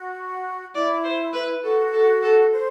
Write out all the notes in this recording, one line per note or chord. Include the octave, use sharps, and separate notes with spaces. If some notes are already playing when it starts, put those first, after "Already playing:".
Already playing: F#4
E4 D5
C5
B4
F#4 A4
A4
A4
C5